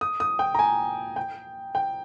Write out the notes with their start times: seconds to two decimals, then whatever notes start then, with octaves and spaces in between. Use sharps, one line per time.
0.01 D#6
0.20 D#6
0.39 G5
0.55 A#5
0.59 G#5
1.16 G5
1.75 G5